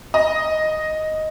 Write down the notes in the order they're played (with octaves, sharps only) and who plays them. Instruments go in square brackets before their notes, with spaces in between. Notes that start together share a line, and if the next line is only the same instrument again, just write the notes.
[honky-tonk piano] D#5